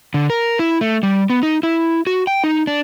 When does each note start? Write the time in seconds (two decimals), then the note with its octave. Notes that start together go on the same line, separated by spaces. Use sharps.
0.14 D3
0.30 A#4
0.59 E4
0.81 A3
1.03 G3
1.30 B3
1.43 D#4
1.63 E4
2.07 F#4
2.27 G5
2.44 D#4
2.67 D4